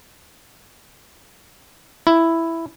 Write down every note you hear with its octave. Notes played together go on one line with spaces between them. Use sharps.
E4